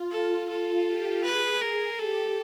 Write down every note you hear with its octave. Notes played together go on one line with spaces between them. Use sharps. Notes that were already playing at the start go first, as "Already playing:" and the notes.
Already playing: F4
F4 A4
F4 A4
G4
G#4 B4
A#4
G4 A4